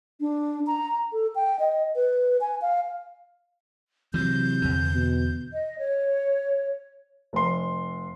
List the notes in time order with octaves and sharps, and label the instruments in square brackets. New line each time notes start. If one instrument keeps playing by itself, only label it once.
[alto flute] D4
A#5
A4
G5
D#5
B4
G#5
F5
[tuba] C3 [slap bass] E3 F#3 [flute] G6
[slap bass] E2 D3
[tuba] B2
[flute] D#5
C#5
[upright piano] F1 C6